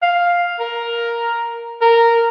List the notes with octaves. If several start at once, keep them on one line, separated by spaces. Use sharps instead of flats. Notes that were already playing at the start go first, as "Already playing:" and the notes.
F5
A#4
A#4